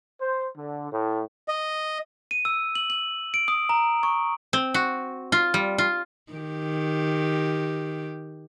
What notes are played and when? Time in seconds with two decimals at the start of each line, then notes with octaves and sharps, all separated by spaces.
0.20 C5
0.58 D3
0.92 A2
1.48 D#5
2.31 D#7
2.45 E6
2.75 F#7
2.90 F#7
3.34 D7
3.48 D#6
3.69 A#5
4.03 C#6
4.53 C4
4.74 F#4
5.32 F4
5.54 G3
5.78 F4
6.32 D#3 G4